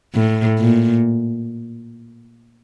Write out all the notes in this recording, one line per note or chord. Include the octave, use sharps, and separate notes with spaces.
A2
A#2